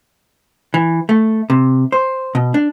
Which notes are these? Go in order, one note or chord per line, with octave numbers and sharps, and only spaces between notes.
E3
A3
C3
C5
B2
D4